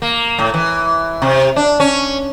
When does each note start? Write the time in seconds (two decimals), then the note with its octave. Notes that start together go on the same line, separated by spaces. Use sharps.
0.02 A#3
0.39 A2
0.54 E3
1.22 C3
1.56 D4
1.80 C#4